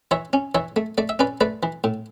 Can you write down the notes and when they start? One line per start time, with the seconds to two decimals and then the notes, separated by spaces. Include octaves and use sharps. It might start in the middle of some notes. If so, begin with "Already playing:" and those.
0.11 E3 C#5 E5
0.33 C#4
0.55 E3 C#5 E5
0.76 A3
0.98 A3 D5
1.09 E5
1.19 C#4 B4 D5
1.41 A3 B4 D5
1.63 E3
1.84 A2